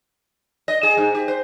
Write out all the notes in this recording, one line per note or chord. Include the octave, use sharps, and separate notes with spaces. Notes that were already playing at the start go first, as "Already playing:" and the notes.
D#5
G#4
G#2
G4
C5